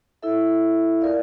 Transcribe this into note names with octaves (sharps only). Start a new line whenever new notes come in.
E4 A4 E5
F4 A#4 D5 F5